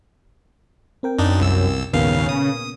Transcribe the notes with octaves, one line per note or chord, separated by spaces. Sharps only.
C4 A#4 G5
F#2 D4 D#4
C2 E6
G#1 D#2 A#2 C#3 A#3 B3 F5
D#6